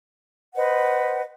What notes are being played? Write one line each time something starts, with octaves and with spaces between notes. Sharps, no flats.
B4 C5 D#5 F#5